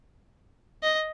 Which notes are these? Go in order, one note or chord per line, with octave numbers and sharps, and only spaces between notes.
D#5